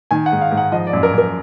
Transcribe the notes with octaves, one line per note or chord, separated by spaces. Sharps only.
D#3 G#5
F#5
G#2
F5
G#2
F#5
F3 D#5
D5
F#2
A#4
F#2 A#4